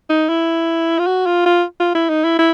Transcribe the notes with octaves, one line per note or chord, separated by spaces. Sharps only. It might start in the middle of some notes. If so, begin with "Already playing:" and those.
D#4
E4
F4
F#4
F4
F4
F4
E4
D#4
E4
E4